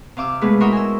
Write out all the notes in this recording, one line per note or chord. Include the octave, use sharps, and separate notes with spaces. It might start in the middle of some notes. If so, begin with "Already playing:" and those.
C3 F5 D6 E6
B2 G#3 A3 G#4 B4
E4 F#4 A#4 C5 C#5 D#5
G#5 E6